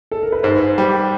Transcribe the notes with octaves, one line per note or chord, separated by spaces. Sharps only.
A4
A#4
B4
G#2 C5
G3